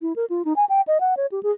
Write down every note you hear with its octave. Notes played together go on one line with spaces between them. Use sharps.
E4
A#4
F4
D#4
G#5
G5
D#5
F#5
C#5
G4
G#4